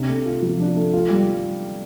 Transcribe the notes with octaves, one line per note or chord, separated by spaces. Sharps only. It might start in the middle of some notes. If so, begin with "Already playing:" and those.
Already playing: C3 D4
A3
F4
F3
D4
A3
F4
G3